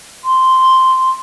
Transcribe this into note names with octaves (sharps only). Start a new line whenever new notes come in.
C6